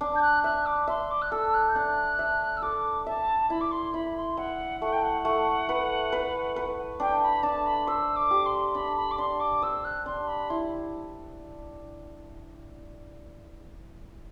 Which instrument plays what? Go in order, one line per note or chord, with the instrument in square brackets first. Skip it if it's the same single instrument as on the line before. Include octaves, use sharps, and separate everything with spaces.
[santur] D4
[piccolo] G6
F#6
[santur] E5 [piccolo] F#6
[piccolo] D6
[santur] E5 [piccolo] C6
[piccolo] D6
F#6
[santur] A4 [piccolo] E6
[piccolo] F#6
G6
[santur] D4 [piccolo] F#6
[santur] E5
[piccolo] E6
[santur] A4 [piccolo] D6
[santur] E5 [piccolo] A5
[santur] E4 [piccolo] B5
[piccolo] D6
C6
[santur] E4 [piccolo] B5
[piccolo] C6
[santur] E5 [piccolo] F#5
[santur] A3 [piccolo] F#5
[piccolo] G5
F#5
[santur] A3
B4
B4
B4
[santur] D4 [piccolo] G5
[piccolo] B5
[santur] D4 [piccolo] A5
[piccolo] B5
[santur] C5 [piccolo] E6
[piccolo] D6
[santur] G4
[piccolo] C6
[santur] D4 [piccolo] B5
[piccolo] B5
D6
[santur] D4 [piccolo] C6
[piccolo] D6
[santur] C5 [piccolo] E6
[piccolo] F#6
[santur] D4 [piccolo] C6
[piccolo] B5
[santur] E4 [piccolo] C6